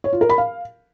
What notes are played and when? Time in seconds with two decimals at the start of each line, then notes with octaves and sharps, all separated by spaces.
0.04 C#5
0.13 F4
0.21 A#4
0.30 B5
0.38 F5